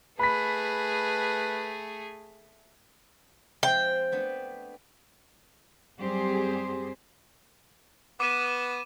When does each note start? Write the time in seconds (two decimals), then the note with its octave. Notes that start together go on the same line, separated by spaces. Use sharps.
0.19 A3 G#4 B4 B5 B6
3.63 F3 G#3 C4 G5
4.12 A3 B3 D4
5.98 F#2 G3 C4 G4 G#4 C5
8.20 B3 D6 D#7 E7